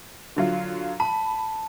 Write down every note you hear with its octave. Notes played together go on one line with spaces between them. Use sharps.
D3 F#3 F4
A5 B5